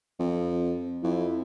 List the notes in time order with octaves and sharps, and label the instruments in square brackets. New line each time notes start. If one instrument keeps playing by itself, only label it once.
[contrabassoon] F2
[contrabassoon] F2 [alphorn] E4